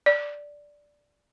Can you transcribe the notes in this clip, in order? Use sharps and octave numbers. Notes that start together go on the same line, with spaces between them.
D5